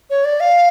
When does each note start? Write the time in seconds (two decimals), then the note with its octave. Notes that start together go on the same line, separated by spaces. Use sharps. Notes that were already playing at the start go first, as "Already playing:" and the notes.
0.10 C#5
0.25 D5
0.40 F5